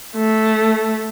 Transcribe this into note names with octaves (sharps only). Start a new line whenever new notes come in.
A3